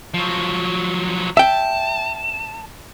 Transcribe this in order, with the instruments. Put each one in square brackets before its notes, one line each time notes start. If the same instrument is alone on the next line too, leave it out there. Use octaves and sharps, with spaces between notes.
[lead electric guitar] F3 F#3
[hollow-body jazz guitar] E5 G5 [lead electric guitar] A5